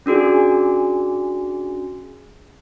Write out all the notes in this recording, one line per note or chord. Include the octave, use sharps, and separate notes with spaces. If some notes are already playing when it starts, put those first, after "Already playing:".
C#4 D4 F#4 G#4